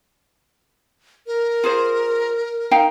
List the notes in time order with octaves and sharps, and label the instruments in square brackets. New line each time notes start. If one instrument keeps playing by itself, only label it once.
[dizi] A#4
[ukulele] F4 G#4 C5
D#4 F5 G5